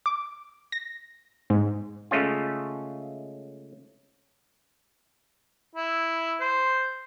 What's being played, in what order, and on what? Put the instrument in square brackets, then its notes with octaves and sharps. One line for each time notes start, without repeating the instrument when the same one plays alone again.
[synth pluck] D6
A#6
G#2
[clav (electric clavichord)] C#3 G#3 A3 C#4 F4
[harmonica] E4
C5